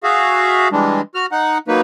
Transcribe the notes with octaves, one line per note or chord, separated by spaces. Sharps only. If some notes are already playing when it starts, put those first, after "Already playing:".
F#4 G#4 E5 F5
E3 G3 G#3 D4
F#4 F6
D#4 F#5
F#3 A#3 D#4 B4